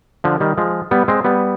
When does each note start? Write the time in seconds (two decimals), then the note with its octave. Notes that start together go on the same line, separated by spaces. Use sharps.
0.24 D3 F3
0.40 D#3 G3
0.58 F3 G#3
0.91 G3 B3
1.08 G#3 C4
1.24 G3 B3